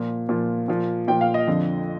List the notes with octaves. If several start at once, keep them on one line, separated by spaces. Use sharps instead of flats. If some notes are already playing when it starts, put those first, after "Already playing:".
Already playing: A#2 F3
A#2 F3
A#2 F3
A#2 F3 G5
F5
D#5
F2 D3 F3